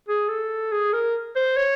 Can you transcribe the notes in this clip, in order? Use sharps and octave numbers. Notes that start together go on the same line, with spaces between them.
G#4
A4
G#4
A#4
C5
C#5